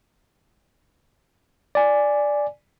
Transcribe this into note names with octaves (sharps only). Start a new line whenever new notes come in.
D5 G#5